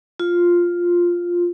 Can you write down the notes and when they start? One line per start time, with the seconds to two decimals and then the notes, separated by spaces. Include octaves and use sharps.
0.20 F4